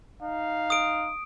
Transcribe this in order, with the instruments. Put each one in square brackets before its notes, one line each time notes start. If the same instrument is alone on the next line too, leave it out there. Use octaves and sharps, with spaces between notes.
[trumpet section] D#4 F5
[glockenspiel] D#6 D7